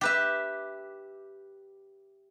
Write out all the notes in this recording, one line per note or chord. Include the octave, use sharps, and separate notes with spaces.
G4 B4 E5